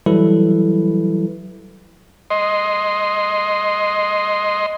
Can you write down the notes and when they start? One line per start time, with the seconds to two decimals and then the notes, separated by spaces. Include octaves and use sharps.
0.06 E3 F#3 G3 E4 A4 B4
2.30 D#5 C6